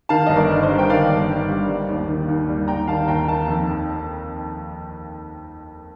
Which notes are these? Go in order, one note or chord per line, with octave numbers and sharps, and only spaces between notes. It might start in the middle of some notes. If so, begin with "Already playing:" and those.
D#3 F5 A5
G1 D#5
A#4 D5
G2
C5 D#5
G3
G5
D#3 D5 F5
G1
G2
G3
G3
D#2
D#3
D#2
G3
D#2 G5 A#5
D#3 F5 A5
D#2 G5 A#5
D#3 F5 A5
F2